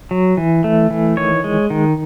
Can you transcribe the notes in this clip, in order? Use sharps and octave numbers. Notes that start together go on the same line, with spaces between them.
F#3
E3
A3
E3
D#3 C#5
G#3
D#3